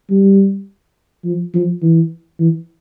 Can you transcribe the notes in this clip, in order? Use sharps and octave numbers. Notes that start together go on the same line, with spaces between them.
G3
F3
F3
E3
E3